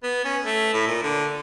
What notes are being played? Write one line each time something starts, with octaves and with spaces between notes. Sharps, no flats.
B3
C#4
A3
A2
A#2
D3